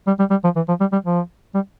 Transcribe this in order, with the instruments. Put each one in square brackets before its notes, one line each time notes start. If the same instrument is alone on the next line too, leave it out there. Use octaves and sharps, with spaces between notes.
[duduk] G3
G3
G3
F3
E3
F3
G3
G3
F3
G3